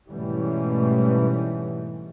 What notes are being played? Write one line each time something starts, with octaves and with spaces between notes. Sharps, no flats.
G#2 B2 E3 G3 A3 C#4